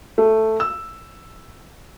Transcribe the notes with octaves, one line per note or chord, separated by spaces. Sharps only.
A3
E6